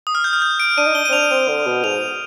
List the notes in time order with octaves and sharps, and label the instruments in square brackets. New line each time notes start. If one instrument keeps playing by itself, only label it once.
[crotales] D#6
F6
G6
F6
G6
D7
[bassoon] D4 [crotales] D#7
[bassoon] D#4
[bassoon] D4 [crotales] G7
[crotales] D#7
[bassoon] C4
[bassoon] D4 [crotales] F7
[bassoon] C4
D3
B2
[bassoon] G#2 [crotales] F7